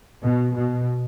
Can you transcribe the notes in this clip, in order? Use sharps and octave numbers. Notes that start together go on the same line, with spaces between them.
B2
B2